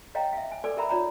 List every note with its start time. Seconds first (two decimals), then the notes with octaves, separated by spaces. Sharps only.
0.15 C#5 D#5 F5 G5 A#5
0.33 E5 F5
0.51 G#5
0.64 A4 B4 D5 G#5 D6
0.77 G4 A#4 E5 A#5 B5
0.89 D#4 F4 C#5 D5 A#5 B5